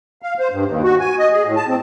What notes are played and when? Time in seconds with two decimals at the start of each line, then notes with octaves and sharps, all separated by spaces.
0.22 F5
0.39 C5
0.51 G2
0.65 D#2
0.84 F#4
1.00 G#5
1.19 D#5
1.32 G#4
1.44 A2
1.56 A5
1.68 C4